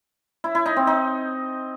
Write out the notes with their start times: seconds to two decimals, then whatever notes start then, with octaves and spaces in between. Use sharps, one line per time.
0.44 E4
0.55 E4
0.66 D#4
0.76 C4
0.87 D#4